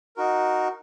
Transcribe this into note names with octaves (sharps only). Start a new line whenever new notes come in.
D#4 F#4 A#4